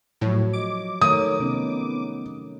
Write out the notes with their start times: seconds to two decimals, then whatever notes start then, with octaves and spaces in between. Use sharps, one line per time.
0.21 A2 F3 F#3 C#5
0.53 D#5 D6
1.01 D#3 A3 A#4 C#5 D#6
1.40 C3 B3 C#4 D#4